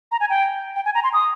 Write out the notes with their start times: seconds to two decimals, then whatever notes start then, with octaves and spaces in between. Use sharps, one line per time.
0.12 A#5
0.20 G#5
0.30 G5
0.76 G5
0.85 G#5
0.95 A#5
1.04 C6
1.13 D#6